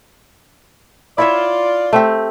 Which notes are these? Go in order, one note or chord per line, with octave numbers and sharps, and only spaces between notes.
E4 F4 C#5 D5 E5
A3 C4 G4